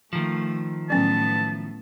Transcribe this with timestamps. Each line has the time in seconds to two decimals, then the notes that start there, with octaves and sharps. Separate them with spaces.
0.13 D#3 F3 A3
0.90 A2 F#3 B3 C#4 A5